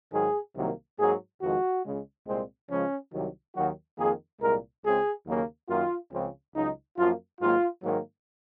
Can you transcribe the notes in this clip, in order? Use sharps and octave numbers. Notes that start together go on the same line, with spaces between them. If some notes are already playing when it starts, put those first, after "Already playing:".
G#2 D#3 F#3 G#4
C2 C3 D#3 F#3 A#3
G#2 F#3 A#3 G#4
F2 C3 D#3 G#3 F#4
C#2 C#3 G#3
C2 A#2 G#3 C4
C#2 C#3 F3 G#3 C#4
C2 C3 D#3 F#3
D#2 D#3 F#3 F#4
F2 D#3 A#3 G#4
C2 A#2 G#3 A#4
C#2 C#3 G#3 C4 G#4
D#2 C#3 F#3 A#3
F#2 D#3 A#3 F4
C#2 C#3 F3 C4
C#2 C#3 F#3 D#4
F#2 F3 A#3 F4
G#2 D#3 F#3 A#3 F4
G#2 D#3 F#3 A#3